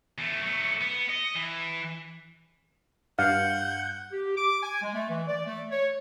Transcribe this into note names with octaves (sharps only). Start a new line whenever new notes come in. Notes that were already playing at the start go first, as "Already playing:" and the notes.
E2 A3
F#3 A3
B3
D#5
E3
G2 F5 F#5 G6
G4
D6
G#5
G#3
A3
E3
D5
A3
C#5